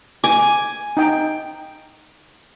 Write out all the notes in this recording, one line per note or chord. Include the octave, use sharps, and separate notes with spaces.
G#5 D6
D#4 G5